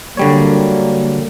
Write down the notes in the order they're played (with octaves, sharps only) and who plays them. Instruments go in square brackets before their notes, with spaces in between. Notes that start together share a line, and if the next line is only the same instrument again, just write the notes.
[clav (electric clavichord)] D3 G3 C#5 [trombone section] F#3 A#3